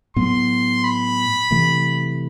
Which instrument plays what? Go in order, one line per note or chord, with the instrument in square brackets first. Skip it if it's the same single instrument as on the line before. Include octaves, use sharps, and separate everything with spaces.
[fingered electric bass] A2 F#3 B3 [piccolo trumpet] C6
[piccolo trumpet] B5
[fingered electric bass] C3 E3 A3